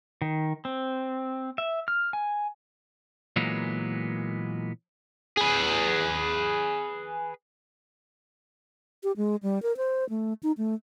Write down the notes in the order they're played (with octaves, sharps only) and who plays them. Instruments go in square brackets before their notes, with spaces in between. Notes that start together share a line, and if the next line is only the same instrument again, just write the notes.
[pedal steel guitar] D#3
C4
E5
F6
G#5
[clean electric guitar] A#2 E3 F#3 G#3 A#3 B3
[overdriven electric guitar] G#4 B4
[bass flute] G4
G#3
G3
A#4
C5
A3
D#4
A3